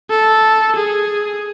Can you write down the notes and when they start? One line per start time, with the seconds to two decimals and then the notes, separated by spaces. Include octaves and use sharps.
0.10 A4
0.76 G#4